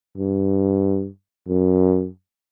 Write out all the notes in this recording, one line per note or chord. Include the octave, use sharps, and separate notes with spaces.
G2
F#2